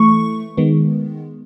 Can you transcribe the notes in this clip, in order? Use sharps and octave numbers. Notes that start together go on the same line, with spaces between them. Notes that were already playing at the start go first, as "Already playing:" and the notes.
Already playing: E3 A3 C#6
D#3 G#3 B3